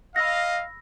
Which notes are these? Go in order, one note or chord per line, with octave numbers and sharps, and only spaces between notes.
D#5 F5 B5 E6 A#6